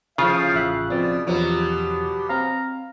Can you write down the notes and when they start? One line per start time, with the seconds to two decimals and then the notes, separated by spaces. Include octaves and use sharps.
0.18 A2 C#3 F3 F4 F5
0.54 A1 E5 F#6
0.90 B2 F3 C4 D5
1.27 E2 B2 F3 F#3 G4
2.29 C4 F5 A#5